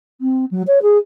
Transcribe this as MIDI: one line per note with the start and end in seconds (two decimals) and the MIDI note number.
0.21 0.45 60
0.51 0.62 54
0.67 0.79 73
0.82 0.97 68